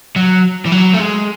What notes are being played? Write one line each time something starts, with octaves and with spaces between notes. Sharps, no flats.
F#3
E3
F#3
A3
G#3